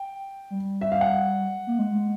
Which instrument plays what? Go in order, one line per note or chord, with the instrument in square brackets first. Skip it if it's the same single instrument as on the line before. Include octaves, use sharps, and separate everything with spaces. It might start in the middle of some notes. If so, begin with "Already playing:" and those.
Already playing: [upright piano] G5
[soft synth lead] G3
[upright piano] E5
F5
F#5
[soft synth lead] A#3
G#3
G#3